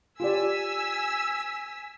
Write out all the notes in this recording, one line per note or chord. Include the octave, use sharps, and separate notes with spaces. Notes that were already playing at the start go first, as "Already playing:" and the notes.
F4 G4 D5 G#5 E6 B6